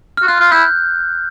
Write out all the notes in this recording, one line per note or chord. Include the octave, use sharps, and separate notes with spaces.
F#4 F6
F4 F#6
F4
E4 G6